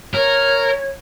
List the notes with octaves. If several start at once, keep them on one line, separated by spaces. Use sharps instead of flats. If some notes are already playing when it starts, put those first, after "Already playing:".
A#4 C#5